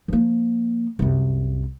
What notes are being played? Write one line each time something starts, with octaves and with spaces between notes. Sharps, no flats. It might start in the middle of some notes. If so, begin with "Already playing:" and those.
F3 A#3
C2 F#2